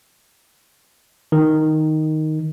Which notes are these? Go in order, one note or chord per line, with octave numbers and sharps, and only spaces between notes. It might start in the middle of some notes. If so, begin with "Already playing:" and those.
D#3